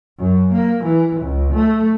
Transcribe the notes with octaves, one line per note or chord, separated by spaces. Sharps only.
F#2
A#3
E3
C#2
A3